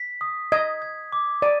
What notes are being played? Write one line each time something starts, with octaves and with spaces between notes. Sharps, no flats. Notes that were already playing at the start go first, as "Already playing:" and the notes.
Already playing: B6
D#6
D#5 G#6
G#6
D6
D5 D#7